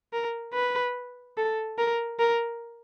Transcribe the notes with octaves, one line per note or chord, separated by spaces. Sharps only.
A#4
B4
A4
A#4
A#4